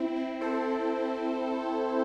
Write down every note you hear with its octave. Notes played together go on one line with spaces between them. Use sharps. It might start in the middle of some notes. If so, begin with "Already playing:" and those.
Already playing: C4 E4
C4 E4
A4 C5